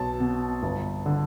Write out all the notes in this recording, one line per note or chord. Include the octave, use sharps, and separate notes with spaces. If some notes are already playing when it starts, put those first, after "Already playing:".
Already playing: B1 A5
B2
G1
D3